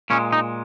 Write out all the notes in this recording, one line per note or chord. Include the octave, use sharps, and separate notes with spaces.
A#2 G#3 C#4
D#4